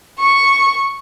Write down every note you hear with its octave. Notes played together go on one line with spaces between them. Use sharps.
C#6